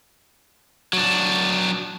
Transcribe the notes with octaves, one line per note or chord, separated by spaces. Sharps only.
F#3 D4